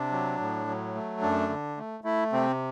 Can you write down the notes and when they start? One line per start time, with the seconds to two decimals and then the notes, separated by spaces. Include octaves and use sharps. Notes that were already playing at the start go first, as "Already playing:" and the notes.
Already playing: C3 D4
0.11 F#3
0.39 A2
0.67 F#3
0.95 A3
1.22 F#2 D4
1.49 D3
1.77 A3
2.04 A3 E4
2.33 C3 C4